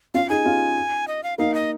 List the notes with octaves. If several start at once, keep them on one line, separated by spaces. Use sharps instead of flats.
C#4 F4 F5
D#4 G#4 G#5
C#4 F4
D#5
F5
A#3 D#4 F5
D#5